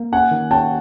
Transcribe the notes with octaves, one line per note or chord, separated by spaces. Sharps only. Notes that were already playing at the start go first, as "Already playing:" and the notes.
Already playing: A#3
C#4 F#5 G#5
D#3
C#4 G5 A5